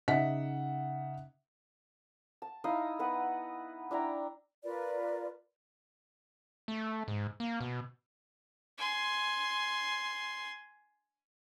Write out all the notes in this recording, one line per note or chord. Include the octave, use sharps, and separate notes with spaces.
C#3 D#4 E5 F#5 B6
A5
D#4 E4 D#5 F5
B3 B4 F#5
D4 E4 G5 A#5
F4 A#4 B4 D5
A3
G#2
A#3
B2
G#5 C6